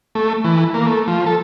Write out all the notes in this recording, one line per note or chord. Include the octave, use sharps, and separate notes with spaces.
A3
E3
A#3
A3
F3
A4